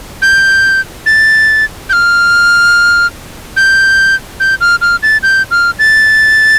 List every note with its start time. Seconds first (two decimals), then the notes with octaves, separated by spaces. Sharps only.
0.22 G6
1.06 A6
1.90 G6
1.93 F6
3.57 G6
4.40 G6
4.61 F6
4.82 F6
5.03 A6
5.23 G6
5.51 F6
5.79 A6